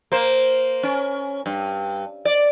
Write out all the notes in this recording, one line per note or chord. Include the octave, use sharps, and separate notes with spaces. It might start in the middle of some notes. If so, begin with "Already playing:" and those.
A#3 C5
C#4
G2
D5